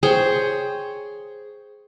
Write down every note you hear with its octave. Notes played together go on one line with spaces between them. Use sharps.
G#4 C5 C#5 G5